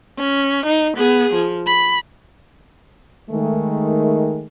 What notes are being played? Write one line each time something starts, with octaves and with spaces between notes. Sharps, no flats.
C#4
D#4
B3 G#4
F3
B5
D#3 G#3 A3